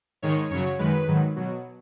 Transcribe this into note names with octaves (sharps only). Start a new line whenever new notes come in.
G#2 D#3 G#3 C#5
F#2 C#3 F#3 C#5
F#2 D#3 G#3 B4
G#2 D#3 F#3
B2 F#3